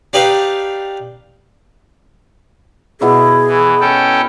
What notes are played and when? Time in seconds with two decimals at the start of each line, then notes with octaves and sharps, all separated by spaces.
0.13 D4 D#4 G4 B4 F5
3.01 B2 E4 G#4 D5
3.47 E3
3.80 C#4 A4 G5